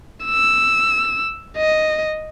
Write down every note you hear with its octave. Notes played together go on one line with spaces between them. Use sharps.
E6
D#5